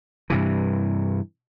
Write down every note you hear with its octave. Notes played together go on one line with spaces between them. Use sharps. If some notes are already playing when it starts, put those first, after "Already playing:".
G2 C3 E3